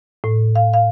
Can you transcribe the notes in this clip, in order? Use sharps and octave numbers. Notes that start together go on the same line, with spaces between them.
A2
F5
F5